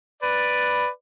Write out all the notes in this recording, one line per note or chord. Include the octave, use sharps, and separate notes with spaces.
B4 D5